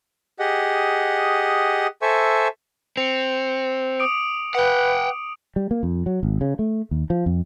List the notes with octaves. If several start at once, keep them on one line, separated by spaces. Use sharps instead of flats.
G4 G#4 D#5 F#5
A4 C5 E5 G#5 C#6 E6
C4 C#7 F7
D6 D#6 D7
B4 F#5 G5
G3
A#3
F2
F#3
G#1
C#3
A3
D#2
F3
F2